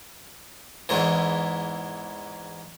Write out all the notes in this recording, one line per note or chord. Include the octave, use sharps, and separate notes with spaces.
E2 G#2 E3